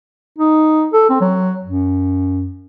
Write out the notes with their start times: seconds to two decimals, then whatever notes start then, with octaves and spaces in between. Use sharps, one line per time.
0.38 D#4
0.93 A4
1.10 C4
1.21 F#3
1.64 F#2